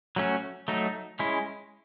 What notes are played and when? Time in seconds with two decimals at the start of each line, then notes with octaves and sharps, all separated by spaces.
0.16 F#3 A3 C#4 F#4
0.68 F#3 A3 D#4
1.19 G#3 C#4 E4